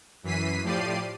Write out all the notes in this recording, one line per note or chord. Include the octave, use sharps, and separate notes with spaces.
F#2 E3 B6 C7 D#7
A2 F3 G4 D5 C7 D#7